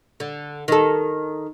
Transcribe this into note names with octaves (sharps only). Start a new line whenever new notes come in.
D3
D#3 A4